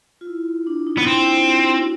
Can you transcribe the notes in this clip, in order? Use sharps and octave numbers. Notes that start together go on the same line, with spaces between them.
F4
E4
D4
D#4
B3
C4 E4
F#4
F4
F#4